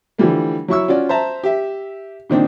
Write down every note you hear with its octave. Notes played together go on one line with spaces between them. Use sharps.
D3 E3 F3 G3 A3
F#3 E4 C#6 E6
C#4 F4 F#4 D5
C5 E5 A5 A#5
G4 E5
A#2 D#3 C4 D4